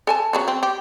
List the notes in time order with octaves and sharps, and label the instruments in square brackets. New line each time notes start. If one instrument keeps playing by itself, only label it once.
[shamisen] A4 G#5 A5
C#3 F#3 F#4
C4
G4